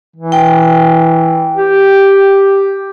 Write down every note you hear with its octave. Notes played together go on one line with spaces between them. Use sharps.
E3
G5
G4